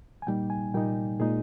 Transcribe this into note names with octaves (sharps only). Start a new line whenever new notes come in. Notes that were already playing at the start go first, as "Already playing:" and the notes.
G#5
A#2 G3 A#3 D#4 G5
G#5
A#2 G3 A#3 D#4 G5
A#2 G#3 D#4 G#4